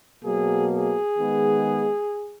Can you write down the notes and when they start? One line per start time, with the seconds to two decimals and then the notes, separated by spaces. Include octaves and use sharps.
0.24 B2 F#3 A#3 G#4
0.72 G#4
1.18 D#3 G#3 B3